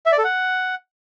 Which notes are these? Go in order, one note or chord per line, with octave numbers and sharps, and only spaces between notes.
E5
D5
A4
F#5